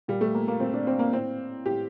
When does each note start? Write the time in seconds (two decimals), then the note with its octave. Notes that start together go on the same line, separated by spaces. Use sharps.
0.08 A#2 G3
0.21 A3
0.35 A#3
0.48 A#3
0.60 A#2 C4
0.73 D4
0.87 C4
0.99 A#3
1.13 A2 C4
1.66 A2 G4